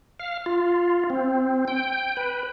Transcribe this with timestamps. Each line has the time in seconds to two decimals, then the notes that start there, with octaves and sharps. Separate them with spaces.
0.20 F5
0.46 F4
1.10 C4
1.68 G5
2.17 B4